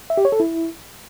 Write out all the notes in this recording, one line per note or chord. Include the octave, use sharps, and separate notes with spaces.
E5
G4
C#5
A4
E4